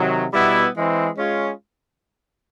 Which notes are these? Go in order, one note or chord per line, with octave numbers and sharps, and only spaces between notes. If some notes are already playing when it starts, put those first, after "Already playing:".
Already playing: C3 D#3 F#3
B2 G3 B3 E4
E3 G#3 C4
G#3 C#4 F4 G#4 C#5